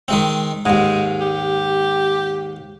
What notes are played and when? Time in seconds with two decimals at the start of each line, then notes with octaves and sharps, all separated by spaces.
0.08 D#3 G#3 C4
0.66 D#2 G#2 G#3
1.21 G4